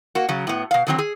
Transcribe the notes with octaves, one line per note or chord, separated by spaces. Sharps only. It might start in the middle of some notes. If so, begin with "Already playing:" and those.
A#3 F#4
C#3 F#3
A2 B3
B2 F5
D3 D#3 F#3 B3 C4
G#4